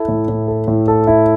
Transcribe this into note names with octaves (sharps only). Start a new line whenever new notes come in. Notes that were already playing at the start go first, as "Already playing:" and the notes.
Already playing: E4 A4
A2
A2
A4
A2
A4
E4